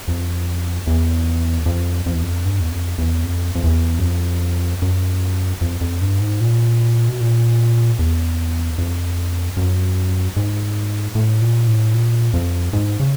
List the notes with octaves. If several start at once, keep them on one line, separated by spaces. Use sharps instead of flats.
F2
E2
F2
F2
E2
F2
G2
E2
F2
E2
F2
F2
E2
F#2
F2
F#2
F2
F2
G2
G#2
A#2
B2
A#2
E2
F2
F#2
G#2
A2
A#2
A2
A#2
F2
G#2
C#3